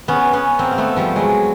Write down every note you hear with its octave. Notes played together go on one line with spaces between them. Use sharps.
B3 C#4
B3 C#4
A#3 C4
A#3
A3 B3
F3 G3
F#3 G#3